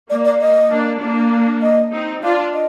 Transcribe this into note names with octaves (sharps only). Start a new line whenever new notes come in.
A#3 D5
D5
D#5
A#3 D4
A#3 D4
D#5
C4 D#4
D4 F4 F5
D#5